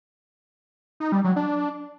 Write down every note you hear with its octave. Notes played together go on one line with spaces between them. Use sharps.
D#4
G3
F#3
D4